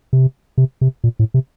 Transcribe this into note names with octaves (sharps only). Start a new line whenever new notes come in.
C3
C3
C3
A#2
A2
C3